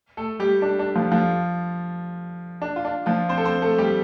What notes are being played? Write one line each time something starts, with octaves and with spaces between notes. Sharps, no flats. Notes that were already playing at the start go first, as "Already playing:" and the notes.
A3 A4
G3 G4
D4
D4
F3 F4
F3 F4
D4
F4
D4
F3 F4
C4 C5
A4
C4 C5
A3 A4
G3 G4